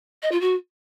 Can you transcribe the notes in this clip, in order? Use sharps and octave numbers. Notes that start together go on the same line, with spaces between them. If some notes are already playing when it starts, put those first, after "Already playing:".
D#5
F4
F#4